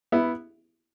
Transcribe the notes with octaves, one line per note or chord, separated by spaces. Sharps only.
B3 E4